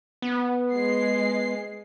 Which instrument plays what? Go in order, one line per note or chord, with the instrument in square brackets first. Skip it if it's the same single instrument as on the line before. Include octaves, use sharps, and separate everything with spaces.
[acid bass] B3
[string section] G#3 C7